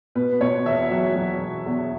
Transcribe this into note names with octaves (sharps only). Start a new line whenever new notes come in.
B2 B4
B2 C#5
E1 E5
F#3
F#3
E1
E2